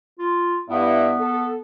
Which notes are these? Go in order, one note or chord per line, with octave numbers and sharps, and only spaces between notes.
F4
G2 B3 E4
A4